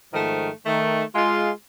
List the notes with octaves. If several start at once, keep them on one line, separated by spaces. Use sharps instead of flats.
G#2 D#3 F3 A3
D#3 A3
G#3 F4